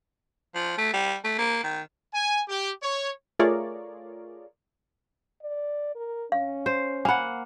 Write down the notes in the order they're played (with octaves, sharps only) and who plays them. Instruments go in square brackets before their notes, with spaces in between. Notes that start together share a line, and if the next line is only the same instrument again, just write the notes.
[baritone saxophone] F3
A3
G3
A3
A#3
D#3
[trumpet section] G#5
G4
C#5
[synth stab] A3 F4 G#4 A#4 C#5 D5
[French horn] D5
A#4
[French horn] C#4 [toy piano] F5
[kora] C5
[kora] A#3 F#5 [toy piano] G#5 B5